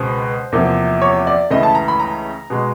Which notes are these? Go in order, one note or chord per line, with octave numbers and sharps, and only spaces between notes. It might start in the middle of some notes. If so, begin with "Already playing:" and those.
Already playing: C#2 B2 G#3 B3 C5
E2 C3 F3 A#3
C#5
D5
C#2 C#3 E3 A3 D#5
A5
A#5
B5
A#5
B2 G#3